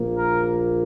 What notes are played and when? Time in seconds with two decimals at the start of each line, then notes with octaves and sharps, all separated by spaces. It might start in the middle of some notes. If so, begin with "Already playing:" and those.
Already playing: A#1 A#2 A#3
0.17 A#4